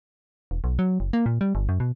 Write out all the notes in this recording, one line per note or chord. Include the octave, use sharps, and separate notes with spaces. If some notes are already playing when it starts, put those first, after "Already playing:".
E1
B1
F#3
F#1
A#3
A#2
G3
G1
F#2
B2